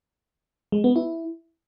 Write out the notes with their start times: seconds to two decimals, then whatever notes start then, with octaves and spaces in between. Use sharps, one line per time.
0.72 G#3
0.84 B3
0.96 E4